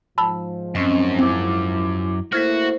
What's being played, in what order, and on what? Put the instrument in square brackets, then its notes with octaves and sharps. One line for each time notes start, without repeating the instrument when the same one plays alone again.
[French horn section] G#2 F3 [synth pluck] A5 B5 E6
[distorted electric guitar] F#2 [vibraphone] C4 C#4 D#5
[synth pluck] C4 [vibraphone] E4 D6
[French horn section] A3 A#3 E4 [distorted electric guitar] F#4 [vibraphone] C5 [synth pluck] F6 G#6 B6